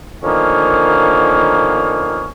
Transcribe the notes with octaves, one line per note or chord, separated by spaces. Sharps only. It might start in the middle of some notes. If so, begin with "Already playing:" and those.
D3 D#3 F3 A#3 B3 C#4